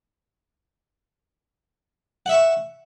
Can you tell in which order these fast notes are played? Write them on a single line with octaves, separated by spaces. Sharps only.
F#5 E5 C#6